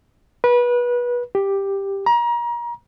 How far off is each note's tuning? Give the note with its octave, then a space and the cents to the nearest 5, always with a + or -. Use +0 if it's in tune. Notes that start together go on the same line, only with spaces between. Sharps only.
B4 -25
G4 +5
A#5 +30